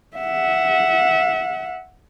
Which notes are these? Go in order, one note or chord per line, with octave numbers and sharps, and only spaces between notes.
E5 F#5